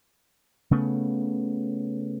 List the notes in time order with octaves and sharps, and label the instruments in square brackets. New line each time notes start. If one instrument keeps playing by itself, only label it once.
[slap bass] C#3 A3 B3